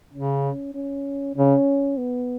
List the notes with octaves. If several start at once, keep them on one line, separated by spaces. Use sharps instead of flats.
C#3 C#4
C#4
C#3 C#4
B3